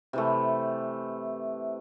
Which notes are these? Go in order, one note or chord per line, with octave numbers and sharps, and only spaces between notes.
C3 E3 A3